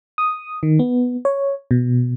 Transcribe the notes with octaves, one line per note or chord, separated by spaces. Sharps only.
D#6
D#3
B3
C#5
B2